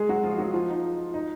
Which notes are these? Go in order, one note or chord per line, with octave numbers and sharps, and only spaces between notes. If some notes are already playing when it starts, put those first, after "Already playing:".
Already playing: G#3 G#4
F#3 F#4
F3 F4
F#3 F#4
F3 F4
D#4
D#4